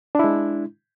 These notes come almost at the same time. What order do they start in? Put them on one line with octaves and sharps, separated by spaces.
D4 E4 G#3